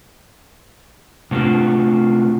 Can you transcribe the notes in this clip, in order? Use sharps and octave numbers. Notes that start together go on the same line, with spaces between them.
C3 A3 D4 F4 F#4